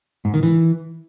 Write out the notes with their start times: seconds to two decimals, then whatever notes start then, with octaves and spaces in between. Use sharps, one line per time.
0.25 G#2
0.34 D#3
0.43 E3